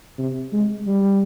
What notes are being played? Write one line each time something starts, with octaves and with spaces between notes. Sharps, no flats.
C3
G#3
G3